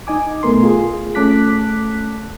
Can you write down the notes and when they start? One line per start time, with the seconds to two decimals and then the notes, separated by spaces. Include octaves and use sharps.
0.07 D#4 D#5 G#5 D6
0.43 B1 A3 B3 A#4 C6
0.63 F4 G#4
1.15 A3 C#4 A5 D6 F#6 B6